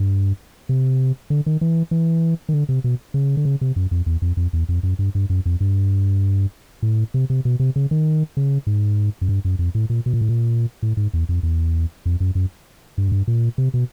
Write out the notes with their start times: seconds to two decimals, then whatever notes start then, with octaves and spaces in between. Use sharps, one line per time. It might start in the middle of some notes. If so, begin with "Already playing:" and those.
Already playing: G2
0.69 C3
1.30 D3
1.46 D#3
1.61 E3
1.91 E3
2.49 D#3
2.53 D3
2.69 C3
2.84 B2
3.14 C#3
3.37 D3
3.45 C#3
3.61 C3
3.76 F#2
3.91 F2
4.06 E2
4.22 F2
4.37 F2
4.53 E2
4.69 F2
4.83 F#2
4.99 G2
5.15 G2
5.30 F#2
5.46 F2
5.60 G2
6.82 A2
7.14 C3
7.30 C3
7.45 B2
7.60 C3
7.76 C#3
7.91 D#3
8.37 C#3
8.67 G#2
9.21 F#2
9.29 G2
9.45 F#2
9.59 F2
9.75 A2
9.90 A#2
10.06 B2
10.14 A#2
10.21 A2
10.29 A#2
10.83 A2
10.97 G#2
11.14 E2
11.29 F2
11.43 E2
12.06 F2
12.20 F#2
12.35 F#2
12.98 G2
13.08 F#2
13.12 G2
13.28 A#2
13.58 C3
13.74 B2